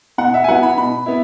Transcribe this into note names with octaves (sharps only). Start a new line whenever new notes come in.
B2 F#5
E5
G#5
F#3 B3 E4 F#5
B5
B2 B5
B3 E4